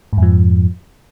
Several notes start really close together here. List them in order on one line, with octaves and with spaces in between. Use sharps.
G#2 F2 F3